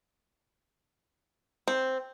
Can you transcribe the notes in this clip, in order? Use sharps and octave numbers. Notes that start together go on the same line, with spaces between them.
C4